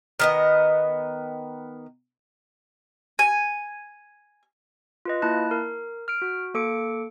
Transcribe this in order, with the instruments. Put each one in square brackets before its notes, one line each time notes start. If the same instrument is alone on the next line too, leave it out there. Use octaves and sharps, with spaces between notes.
[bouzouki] D#3 B3 D#5
[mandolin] G#5
[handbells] F4 B4 D#5
A#3 E4 A5 F#6
A#4
F6 D7
F#4
A#3 A4 D6 C#7 D7